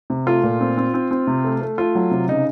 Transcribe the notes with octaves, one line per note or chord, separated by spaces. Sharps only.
C3
A3 F4
A#2
C4
C4
C4
C4
C3
A3
A3
A3 F4
F#3
C3
C#3 D#4